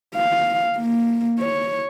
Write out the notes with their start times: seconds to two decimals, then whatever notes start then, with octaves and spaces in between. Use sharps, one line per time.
0.15 F5
0.78 A#3
1.40 C#5